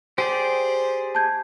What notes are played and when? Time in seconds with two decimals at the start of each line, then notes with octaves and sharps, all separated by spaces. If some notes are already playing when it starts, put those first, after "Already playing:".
0.18 G4 G#4 C5 D5
1.15 A5 G6 G#6